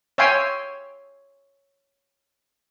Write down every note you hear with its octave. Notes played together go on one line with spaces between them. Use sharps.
C#5 E5 F5 G5 G#5 C6